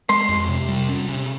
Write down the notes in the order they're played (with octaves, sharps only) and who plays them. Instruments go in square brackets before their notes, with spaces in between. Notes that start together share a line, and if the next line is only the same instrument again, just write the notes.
[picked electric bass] G#3 [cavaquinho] C6
[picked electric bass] F2
C3
G3
C#4
C3